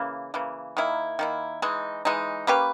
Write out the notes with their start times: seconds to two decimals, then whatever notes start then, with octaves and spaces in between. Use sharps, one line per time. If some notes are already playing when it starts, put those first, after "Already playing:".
Already playing: C#3 E3 A#3
0.34 C#3 E3 A#3
0.77 D#3 A#3 E4
1.19 D#3 A#3 E4
1.62 E3 G#3 D#4
2.05 E3 G#3 D#4
2.47 A#3 C#4 G4 B4